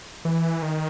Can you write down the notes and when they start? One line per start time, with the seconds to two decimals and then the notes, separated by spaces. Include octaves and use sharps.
0.25 E3
0.62 D#3